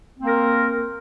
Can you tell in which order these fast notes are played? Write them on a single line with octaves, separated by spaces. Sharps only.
C4 A#3 A#4